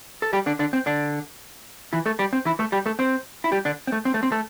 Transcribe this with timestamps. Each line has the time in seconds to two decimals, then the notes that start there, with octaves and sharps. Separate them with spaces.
0.22 A4
0.33 G3 G4
0.46 D3 D4
0.59 D3 D4
0.73 C4
0.86 D3 D4
1.93 E3 E4
2.06 A3 A4
2.19 G3 G4
2.33 C4
2.45 E3 E4
2.59 A3 A4
2.72 G3 G4
2.86 A3 A4
2.99 C4 C5
3.44 E4
3.52 G3 G4
3.65 D3 D4
3.87 C4
3.92 A3
4.05 C4
4.14 A3
4.23 C4
4.32 A3 A4